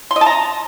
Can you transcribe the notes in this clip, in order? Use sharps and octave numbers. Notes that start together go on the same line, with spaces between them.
C6
D#5
A5
A#5